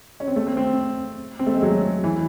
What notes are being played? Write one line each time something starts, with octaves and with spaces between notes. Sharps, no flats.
C#4
C4
A3
C4
C4
C4
A3
G#3
F#3
E3